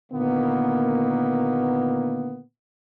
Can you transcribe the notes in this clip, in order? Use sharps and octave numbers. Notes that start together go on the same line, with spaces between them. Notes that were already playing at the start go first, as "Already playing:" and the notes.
A#2 D3 D#3 A#3 B3